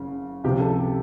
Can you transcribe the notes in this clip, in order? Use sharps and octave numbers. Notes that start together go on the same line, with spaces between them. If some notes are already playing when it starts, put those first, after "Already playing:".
Already playing: F#1 C#3
C#2 C3 F3 G4
A4